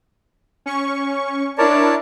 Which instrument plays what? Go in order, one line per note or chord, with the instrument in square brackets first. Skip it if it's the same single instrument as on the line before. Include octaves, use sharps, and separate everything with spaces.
[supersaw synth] C#4 C#6
[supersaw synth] D4 E4 A#4 [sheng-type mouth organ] C#5 D5 A5